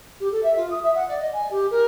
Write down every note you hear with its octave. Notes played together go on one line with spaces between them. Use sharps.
G4
A4
E5
F4
D#6
E5
F#5
D5
D#5
G#5
G4
A#4